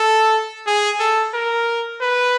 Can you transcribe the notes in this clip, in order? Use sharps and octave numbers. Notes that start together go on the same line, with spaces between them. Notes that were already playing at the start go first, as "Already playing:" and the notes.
Already playing: A4
G#4
A4
A#4
B4